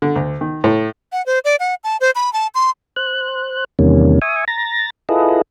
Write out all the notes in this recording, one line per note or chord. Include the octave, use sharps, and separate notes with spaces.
D3
D2
D#3
A2
F#5
C5
D5
F#5
A5
C5
B5
A5
C6
C5 F#6
E2 C3 D#3 G3 A#3 C#4
E5 G#5 C#6 D#6
A#5 A6 A#6
E4 F4 G#4 A4 B4 D#5